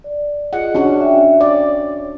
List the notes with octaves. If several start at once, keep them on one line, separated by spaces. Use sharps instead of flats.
D5
F4 G#4 D#5 F#5
C#4 D4 F#4
E5 G5
C#5 D5